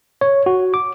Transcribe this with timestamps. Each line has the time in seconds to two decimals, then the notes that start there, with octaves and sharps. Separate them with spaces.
0.21 C#5
0.46 F#4
0.74 D6